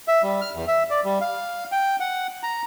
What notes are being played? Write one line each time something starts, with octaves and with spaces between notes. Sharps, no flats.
E5
G3
F6
E2
E5
D5
G3
F5
G5
F#5
A#5